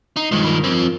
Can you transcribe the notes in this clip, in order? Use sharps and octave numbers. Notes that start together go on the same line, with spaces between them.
D#4 C7
G2 D#3 F3 G3 G#3
A#4 B5
F3 C4 C#4 F4